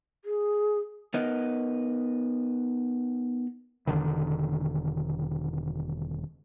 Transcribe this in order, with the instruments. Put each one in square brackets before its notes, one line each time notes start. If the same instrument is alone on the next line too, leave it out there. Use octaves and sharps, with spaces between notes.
[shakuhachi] G#4
[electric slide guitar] B3 D#4 A#4 B4 D#5
[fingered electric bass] E1 D2 D3 D#3